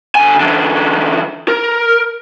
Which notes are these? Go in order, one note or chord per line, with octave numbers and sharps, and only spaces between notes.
D3 G#5
D3 E3
A#4